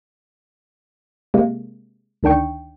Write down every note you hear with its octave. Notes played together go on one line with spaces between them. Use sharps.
C3 G#3 A#3
D2 D#3 D4 G5 C#6